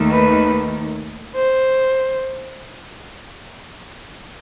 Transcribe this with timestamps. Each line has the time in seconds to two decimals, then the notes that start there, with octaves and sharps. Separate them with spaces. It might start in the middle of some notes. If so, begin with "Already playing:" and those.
Already playing: D#2 D#3 A3
0.12 B4
1.34 C5